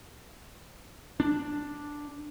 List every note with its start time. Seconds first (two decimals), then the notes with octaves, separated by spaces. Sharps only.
1.20 D4